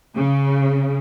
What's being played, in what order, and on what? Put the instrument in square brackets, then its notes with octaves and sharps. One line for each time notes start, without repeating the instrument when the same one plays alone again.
[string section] C#3